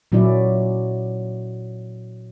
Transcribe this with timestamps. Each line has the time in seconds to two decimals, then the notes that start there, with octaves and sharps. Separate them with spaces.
0.12 A#2 F#3 C#4 E4 D5